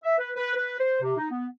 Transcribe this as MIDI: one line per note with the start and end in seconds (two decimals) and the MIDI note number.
0.04 0.16 76
0.18 0.30 71
0.36 0.55 71
0.56 0.78 71
0.79 1.00 72
1.01 1.15 48
1.17 1.27 63
1.31 1.46 59